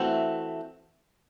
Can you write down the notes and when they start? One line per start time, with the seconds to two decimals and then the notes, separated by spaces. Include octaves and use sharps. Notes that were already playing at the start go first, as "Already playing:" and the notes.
Already playing: E3 A3 C4 F#4